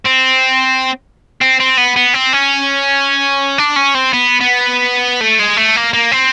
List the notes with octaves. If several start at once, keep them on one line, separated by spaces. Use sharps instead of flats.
C4
C4
C4
B3
B3
C4
C#4
D4
C#4
C4
B3
B3
A3
G#3
A3
A#3
A#3
C4